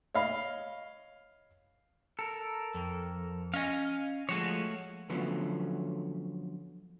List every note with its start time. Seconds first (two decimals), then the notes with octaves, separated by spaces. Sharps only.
0.14 C#5 D#5 F5 B5
2.19 A4 A#4
2.74 F2
3.54 C#4 D#5 F5 G#5
4.29 F3 G#3 A3 F#4 C#5
5.09 D3 F3 F#3 A3 B3 C#4